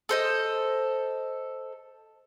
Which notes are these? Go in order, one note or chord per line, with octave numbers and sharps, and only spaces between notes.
A4 C5 D#5